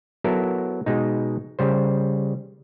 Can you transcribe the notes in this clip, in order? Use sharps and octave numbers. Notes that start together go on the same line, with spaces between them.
F#3 B3 E4 A4 A#4
B2 G#3 D#4
C#3 G3 C5